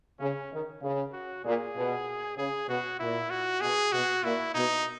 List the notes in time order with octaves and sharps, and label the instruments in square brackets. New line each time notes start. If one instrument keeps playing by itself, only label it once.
[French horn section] C#3 [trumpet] C#4
[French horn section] D#3
C#3
[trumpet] F#4
[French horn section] A#2 [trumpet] G#4
[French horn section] B2
[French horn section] C#3 [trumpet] G#4
[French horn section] B2 [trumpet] F#4
[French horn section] A#2 [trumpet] E4
[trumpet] F#4
[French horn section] B2 [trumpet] G#4
[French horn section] B2 [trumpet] F#4
[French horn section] A#2 [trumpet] E4
[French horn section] B2 [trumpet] D#4